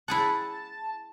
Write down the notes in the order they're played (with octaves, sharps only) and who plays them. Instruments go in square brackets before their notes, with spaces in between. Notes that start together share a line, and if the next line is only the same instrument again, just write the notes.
[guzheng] E4 G#4 F#5 [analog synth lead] A5